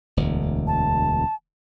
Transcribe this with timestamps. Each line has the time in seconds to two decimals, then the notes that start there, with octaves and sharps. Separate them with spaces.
0.17 E1 D2
0.67 A5